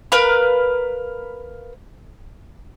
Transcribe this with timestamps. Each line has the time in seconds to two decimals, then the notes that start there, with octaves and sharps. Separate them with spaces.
0.12 A#4 B4 F5